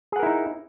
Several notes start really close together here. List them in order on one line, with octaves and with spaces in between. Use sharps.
G#4 F#5 A#4 E4 D#4